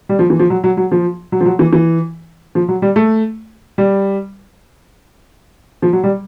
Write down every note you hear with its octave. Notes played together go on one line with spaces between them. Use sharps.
G3
F3
E3
F3
F#3
F#3
F#3
F3
F#3
F3
F#3
E3
E3
F3
F#3
G3
A3
G3
F3
F#3
G3